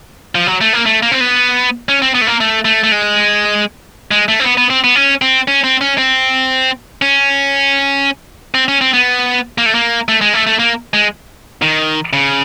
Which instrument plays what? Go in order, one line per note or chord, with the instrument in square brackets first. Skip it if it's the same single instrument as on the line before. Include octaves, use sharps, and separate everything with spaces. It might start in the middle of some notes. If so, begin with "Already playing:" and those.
[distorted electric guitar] F3
F#3
A3
A#3
A3
A#3
C4
B3
C#4
C4
B3
A3
A#3
A3
A3
A3
G#3
G#3
A3
C4
B3
B3
C4
B3
C#4
C4
C#4
C4
C#4
C4
C#4
C4
C#4
C4
B3
A#3
A3
A#3
A3
G#3
A3
A3
A#3
G#3
D#3
C#3